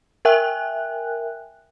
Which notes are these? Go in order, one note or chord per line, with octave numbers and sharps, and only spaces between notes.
A#4 E5 G5 G#5 F#6